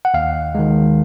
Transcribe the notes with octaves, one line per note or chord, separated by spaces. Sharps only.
F#5
D#2 F5
D#3 G#3